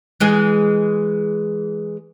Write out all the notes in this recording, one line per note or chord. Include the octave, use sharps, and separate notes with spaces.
E3 G#3 G#4